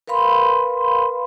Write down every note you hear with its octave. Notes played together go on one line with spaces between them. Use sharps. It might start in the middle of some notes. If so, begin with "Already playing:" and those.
A#4 B4 F5 B5 C6